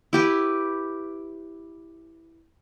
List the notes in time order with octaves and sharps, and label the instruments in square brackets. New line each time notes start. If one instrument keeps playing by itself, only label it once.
[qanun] E4 G4 B4